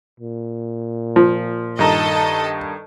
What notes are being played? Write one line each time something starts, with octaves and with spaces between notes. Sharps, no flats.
A#2
F3
G2 D#3 A4 D#5 A#5